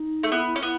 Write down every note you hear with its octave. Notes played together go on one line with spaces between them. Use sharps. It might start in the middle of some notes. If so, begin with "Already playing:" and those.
Already playing: D#4
A3
B3 E4
E4
C#4
B3 E4